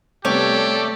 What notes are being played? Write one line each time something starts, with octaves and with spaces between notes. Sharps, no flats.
C3 G3 A3 B3 G4 C#5 D5